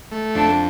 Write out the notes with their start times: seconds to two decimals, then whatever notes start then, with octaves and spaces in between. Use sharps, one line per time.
0.12 A3
0.35 F2 D4